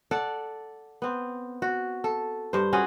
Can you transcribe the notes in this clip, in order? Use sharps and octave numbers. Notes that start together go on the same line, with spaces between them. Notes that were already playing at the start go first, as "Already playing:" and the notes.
A4 D5 F#5
B3 C4
F#4
A4
G2 C5
C4 C#4 F#4 G#4